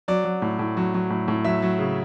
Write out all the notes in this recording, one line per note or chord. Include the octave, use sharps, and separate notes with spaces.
F#3 D5
F#3
A2
A2
F#3
F#3
A2
A2
F#3 E5
F#3
C#3